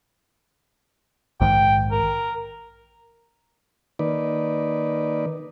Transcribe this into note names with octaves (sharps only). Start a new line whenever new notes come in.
A#1 G#2 D#3 G5
A#4
D#3 A#3 D#4 B4 D5